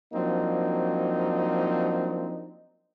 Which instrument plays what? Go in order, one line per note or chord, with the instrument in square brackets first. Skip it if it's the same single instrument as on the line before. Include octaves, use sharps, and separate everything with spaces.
[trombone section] F3 F#3 A#3 C4 D4 D#4